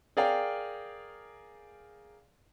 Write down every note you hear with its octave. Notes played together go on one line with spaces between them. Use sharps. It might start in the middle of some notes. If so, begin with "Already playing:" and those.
G#4 A#4 D5 F5 G5